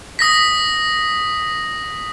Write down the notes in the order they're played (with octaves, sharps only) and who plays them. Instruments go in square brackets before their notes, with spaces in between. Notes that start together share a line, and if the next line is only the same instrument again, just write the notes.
[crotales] D#6 A#6 B6